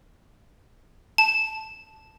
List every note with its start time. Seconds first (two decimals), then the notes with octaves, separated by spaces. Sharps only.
1.18 A5